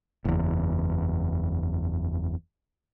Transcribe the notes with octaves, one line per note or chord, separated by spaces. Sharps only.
F#1 E2